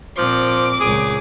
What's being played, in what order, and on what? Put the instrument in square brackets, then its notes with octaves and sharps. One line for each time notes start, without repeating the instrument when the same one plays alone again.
[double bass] A#2 C4 [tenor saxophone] F3 [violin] D6
[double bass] C#2 A#2 [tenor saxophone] G#4